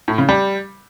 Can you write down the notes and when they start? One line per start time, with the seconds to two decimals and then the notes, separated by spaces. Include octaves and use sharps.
0.08 A2
0.18 C#3
0.29 G3